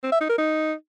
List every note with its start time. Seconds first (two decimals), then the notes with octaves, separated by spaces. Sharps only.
0.03 C4
0.12 E5
0.21 D#4
0.29 A#4
0.38 D#4